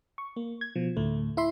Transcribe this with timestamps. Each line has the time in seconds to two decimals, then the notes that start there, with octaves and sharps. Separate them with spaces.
0.18 C#6
0.36 A#3
0.61 G#6
0.76 B2 F3
0.97 D2 A2 A3
1.37 E4 E5 C6